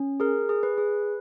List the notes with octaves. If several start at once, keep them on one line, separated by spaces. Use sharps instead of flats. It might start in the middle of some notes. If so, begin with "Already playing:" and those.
Already playing: C#4
G#4 A#4
G#4
B4
G#4